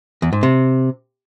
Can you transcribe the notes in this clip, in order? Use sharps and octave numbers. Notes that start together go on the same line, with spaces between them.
E2
G#2
C3